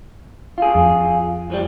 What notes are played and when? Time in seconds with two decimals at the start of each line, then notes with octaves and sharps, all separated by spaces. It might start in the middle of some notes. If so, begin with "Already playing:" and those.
0.58 F4 G#4
0.75 F2
1.50 B1 F3 G3